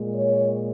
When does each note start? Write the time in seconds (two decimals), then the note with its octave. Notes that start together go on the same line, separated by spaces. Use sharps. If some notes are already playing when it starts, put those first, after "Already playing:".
Already playing: A#2 G#3
0.13 C#5